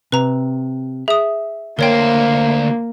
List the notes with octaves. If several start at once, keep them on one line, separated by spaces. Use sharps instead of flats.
C3 B4 A#5
G#4 E5 D#6
D2 A#3 A#4 C5 C#5 G5